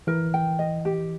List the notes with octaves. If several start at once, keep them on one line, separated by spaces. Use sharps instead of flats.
E3 A#4
G5
D#5
G4